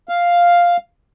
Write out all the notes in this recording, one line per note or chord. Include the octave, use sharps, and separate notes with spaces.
F5